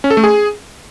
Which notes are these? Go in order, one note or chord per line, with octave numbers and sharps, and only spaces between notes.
C#4
A4
A3
G#4